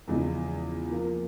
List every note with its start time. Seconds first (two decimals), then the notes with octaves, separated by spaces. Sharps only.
0.08 E2 C#3 F3 G#3
0.90 F3 A#3 F4